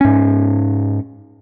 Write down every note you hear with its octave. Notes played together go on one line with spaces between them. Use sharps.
G#2 C#4